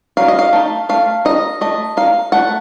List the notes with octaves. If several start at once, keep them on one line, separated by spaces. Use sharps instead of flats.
F#3 F5
D#5
F5
A3 D#4
A3 F5
D#4 D#5
A3 D#5
D#4 F5
A3 F#5